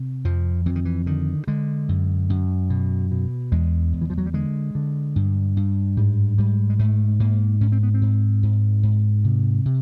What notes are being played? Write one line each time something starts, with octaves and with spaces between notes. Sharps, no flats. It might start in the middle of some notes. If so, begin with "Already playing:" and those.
Already playing: C3
F2 F3
F2 E3
D#3
E3
D3 D#3
D3 G#3
F#2
F#2
B2
B2
E2 G#3
E2
E3
F3
F#3
G3
D3 G#3
D3
G2
G2
G#2 G3
G#2 G3
G#3
G#2 A3
G#2 A#3
G#2 C#4
C4
B3
C4
G#2
G#2
G#2
C3
C3